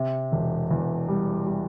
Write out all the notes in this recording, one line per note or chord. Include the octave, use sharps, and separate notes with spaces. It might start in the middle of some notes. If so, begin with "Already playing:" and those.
Already playing: C3
E1
E2
G3
G3